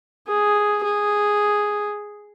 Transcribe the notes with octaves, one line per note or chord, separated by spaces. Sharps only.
G#4
G#4